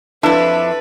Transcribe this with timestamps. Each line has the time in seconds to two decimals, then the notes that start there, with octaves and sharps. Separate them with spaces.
0.23 F2 D4 E4 A4 B4